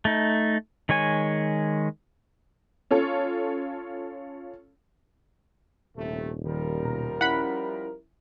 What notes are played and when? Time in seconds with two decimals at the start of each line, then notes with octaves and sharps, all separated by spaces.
0.05 A3 D#4
0.89 D#3 G#3 C#5 G#5
2.91 C#4 F4 A4 C#5
5.97 D#1 A2 C3 A3
6.46 D#3 F3 G3 A#4
6.85 B2 A#5
7.21 C#4 E4 F#5 B5